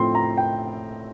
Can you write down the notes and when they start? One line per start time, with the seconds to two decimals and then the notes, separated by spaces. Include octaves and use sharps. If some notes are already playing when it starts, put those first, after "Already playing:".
Already playing: A2 F3 A3 C4 C6
0.15 A#5
0.38 G5